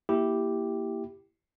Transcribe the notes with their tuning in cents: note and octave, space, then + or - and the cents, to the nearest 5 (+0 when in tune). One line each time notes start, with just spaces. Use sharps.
A#3 +0 E4 +0 G4 +0